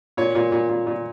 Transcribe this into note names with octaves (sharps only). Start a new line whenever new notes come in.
A#2 C#5
A#2
A#2
A#2
A#2